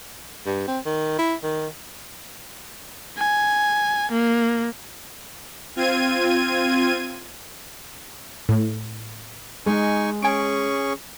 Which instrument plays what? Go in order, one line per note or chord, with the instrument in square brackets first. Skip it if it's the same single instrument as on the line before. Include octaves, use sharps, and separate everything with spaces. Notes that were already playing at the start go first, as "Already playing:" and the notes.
[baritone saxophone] G2
C4
D#3
E4
D#3
[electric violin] G#5
A#3
[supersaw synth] C4 F4 G#6 D#7
[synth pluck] A2
[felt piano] G#3 [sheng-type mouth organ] D#4 G#5 C#6
[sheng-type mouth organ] C#4 G#4 C#6 [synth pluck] G#5 D7